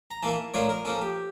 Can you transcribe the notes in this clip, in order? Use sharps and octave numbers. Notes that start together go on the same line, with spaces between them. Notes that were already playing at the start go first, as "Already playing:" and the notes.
A#5
E3 A#3 E4 A5
A2 F3 A#3 D4 F4 C#5
A#4
F3 A#3 C#4 A4
G4